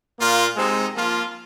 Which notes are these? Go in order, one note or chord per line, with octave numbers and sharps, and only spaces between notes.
A#2 A#3 F4
C3 G#3 C4 D#4
F3 A#3 F4